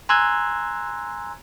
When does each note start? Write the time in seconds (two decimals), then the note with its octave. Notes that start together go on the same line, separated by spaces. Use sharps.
0.09 G#5 A#5 C6 E6 F#6 G#6